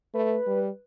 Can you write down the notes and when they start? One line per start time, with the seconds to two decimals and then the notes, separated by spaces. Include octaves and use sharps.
0.14 A3 B4
0.47 G3